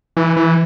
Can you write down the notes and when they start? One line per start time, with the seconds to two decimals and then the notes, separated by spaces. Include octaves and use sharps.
0.17 E3
0.36 E3